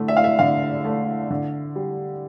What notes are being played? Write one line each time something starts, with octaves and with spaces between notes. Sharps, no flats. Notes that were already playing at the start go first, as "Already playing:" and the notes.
Already playing: D3 A3
E5
F5
E5
D3 F5
A3
D3
G3